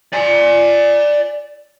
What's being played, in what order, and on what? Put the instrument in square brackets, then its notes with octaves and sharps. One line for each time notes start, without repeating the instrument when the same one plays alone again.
[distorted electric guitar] D5 G#5